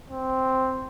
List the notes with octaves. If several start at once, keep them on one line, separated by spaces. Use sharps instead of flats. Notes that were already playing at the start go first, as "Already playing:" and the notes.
C4